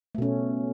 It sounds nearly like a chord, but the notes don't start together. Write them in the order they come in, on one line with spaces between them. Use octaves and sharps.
A3 B2 C#4